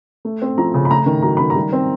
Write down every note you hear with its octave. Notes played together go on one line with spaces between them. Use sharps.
A3
C4
F3 A#5
C#3
B5
A3 A#5
D#3
F#3 A#5
D#3 B5
A#5
G3
C4